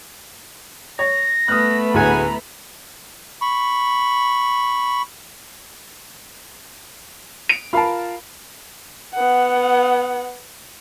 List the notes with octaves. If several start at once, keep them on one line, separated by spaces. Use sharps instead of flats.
C#5 A#6
A3 B3 B5 D#6 F6 F#6
D2 A2 G#4 F#5 G#5 A#5
B5 C#6
D7 F7
F4 A#4 F5 A5 B5
B3 F#5